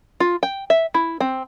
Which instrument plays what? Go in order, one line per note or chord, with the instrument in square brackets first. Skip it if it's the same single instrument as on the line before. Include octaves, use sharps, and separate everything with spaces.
[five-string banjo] F4
G5
E5
E4
C4